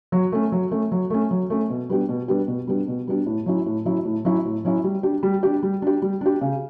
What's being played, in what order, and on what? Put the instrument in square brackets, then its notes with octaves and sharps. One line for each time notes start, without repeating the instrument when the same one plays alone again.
[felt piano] F#3
A3 C#4
F#3
A3 C#4
F#3
A3 C#4
F#3
A3 C#4
B2
G3 B3 D4 G4
B2
G3 B3 D4 G4
B2
G3 B3 D4 G4
B2
G3 B3 D4 G4
A2
F#3 C#4 E4
A2
F#3 C#4 E4
A2
F#3 C#4 E4
A2
F#3 C#4 E4
G3
D4 G4
G3
D4 G4
G3
D4 G4
G3
D4 G4
C#3